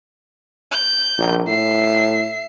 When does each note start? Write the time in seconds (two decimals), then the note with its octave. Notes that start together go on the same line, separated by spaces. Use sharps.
0.72 G6
1.18 A#1
1.47 A2 E5 C7